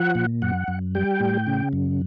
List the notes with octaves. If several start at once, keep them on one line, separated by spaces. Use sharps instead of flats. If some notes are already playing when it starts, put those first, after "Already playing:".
Already playing: F3 F#5
A#2
F#2 F#5
F#2
G3 G5
A2
C#3
F#2